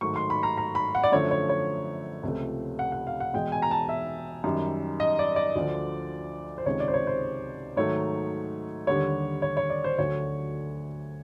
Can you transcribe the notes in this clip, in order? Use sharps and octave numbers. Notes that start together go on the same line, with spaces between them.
G#2 D#3 F#3 A3 C#6
C6
B5
A#5
A#5
B5
F#5
D5
F#2 D3 F3 A3 C#5
C#5
C#5
C#2 C3 F3 A3
F#5
F#5
F5
F#5
E2 B2 G#3 G5
G#5
A#5
A5
E5
F#2 D#3 G3
D#5
D5
D5
D2 D3 F3
C5
C#2 C3 D#3 G#3 C#5
D5
C5
C#5
C5
G#2 D#3 F#3 A3 C#5
D#2 D3 G3 C#5
C#5
C#5
D5
C5
D2 D3 F#3 A3 C#5